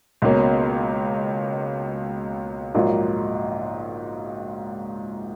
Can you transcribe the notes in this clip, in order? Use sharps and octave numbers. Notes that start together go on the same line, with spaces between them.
C#2 B2 A#3 C#4
A#1 G#2 F#3 A#3 F4